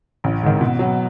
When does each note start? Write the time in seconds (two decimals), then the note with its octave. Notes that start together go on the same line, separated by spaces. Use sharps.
0.24 A1
0.43 G#2 D#3
0.61 B2
0.79 F#3 B3